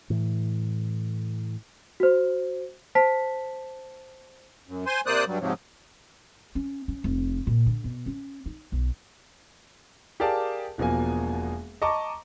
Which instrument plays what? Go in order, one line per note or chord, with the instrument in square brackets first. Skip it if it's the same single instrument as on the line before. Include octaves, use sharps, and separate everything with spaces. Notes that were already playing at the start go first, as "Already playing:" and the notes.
[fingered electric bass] A2 E3
[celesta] F#4 C5
C5 A5 B6
[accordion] F#2
C5 G#5 C6
C3 A#3 C5 D5 D#6 F#6
G2 F#3 G3
G#2 C3 F3 F#3
[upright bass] C#4
C#4
F1
A#2
D3
B2
C#4
D#4
B1
[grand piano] G4 G#4 A#4 D5 F5 A5
E1 B2 F3 A#3 G#5
D#5 A5 A#5 C#6 D6